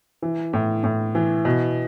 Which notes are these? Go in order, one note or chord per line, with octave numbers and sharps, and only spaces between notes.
E3
A2
A2
E3
B2